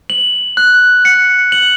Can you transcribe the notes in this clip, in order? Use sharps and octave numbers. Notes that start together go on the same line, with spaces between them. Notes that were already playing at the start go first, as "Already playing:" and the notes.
F#7
F#6
C#7
F#7